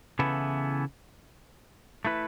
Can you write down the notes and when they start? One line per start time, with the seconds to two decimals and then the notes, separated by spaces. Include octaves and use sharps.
0.19 C#3 E3 B3 E4 A4
2.05 A3 E4 B4